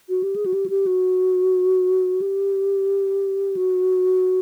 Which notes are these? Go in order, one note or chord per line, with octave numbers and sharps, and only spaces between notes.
F#4
G4
G#4
F#4
G4
F#4
G4
F#4
G4
F#4